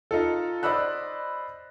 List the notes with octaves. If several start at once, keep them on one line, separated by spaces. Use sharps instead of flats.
D#4 F4 A4
C5 D5 D#5 B5 E6 F#6